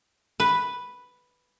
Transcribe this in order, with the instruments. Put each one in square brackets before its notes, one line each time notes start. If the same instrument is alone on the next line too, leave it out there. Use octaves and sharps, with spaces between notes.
[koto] B4